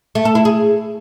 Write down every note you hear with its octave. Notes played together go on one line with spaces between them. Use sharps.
A3
A4
E4
G#4